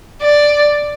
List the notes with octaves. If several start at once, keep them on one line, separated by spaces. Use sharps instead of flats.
D5